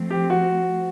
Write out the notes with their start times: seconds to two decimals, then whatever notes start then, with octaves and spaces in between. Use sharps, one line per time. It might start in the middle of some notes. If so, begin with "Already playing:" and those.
Already playing: F3 A3 C4
0.11 G4
0.30 F#4